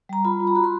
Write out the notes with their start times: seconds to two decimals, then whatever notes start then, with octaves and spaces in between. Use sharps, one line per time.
0.09 G3 A#5
0.25 F4 B5
0.40 F4
0.47 A#5
0.55 F#4 B5
0.64 C6